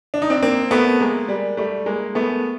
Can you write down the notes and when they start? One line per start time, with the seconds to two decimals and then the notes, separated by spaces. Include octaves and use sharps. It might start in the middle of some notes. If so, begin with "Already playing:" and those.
0.14 D4
0.22 D#4
0.30 C4 D4
0.42 A#3 C4
0.71 A3 B3
1.00 G#3 A#3
1.29 G3
1.57 G3 A3
1.86 G#3 A#3
2.15 A3 B3